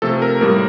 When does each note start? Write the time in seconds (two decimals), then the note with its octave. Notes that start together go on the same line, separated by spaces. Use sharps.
0.02 C3 F3 A3 A4
0.22 A#4
0.41 A2 G3 A#3 A#4